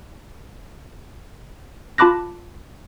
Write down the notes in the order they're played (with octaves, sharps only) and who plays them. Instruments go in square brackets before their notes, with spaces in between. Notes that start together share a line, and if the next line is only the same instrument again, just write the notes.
[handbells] F4 A5 B5 D6 F#6 A#6